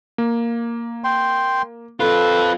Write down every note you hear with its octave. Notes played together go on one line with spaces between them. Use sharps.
A#3
G5 C6
C4 F4 A4 B4